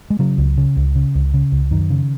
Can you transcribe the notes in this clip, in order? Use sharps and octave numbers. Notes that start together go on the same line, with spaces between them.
G#3
C#3 F#3
C#2
C#3
C#2
C#3
C#2
C#3
C#2
F#2 D#3
C#3